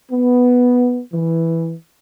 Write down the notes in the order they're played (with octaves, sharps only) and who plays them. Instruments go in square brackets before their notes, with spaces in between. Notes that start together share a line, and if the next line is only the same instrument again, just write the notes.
[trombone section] B3
E3